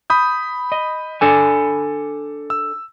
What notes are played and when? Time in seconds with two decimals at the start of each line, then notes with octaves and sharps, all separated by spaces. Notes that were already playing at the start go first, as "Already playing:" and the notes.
0.10 B5 D#6 G6
0.72 D#5
1.21 D4 A4 G#5
2.50 E6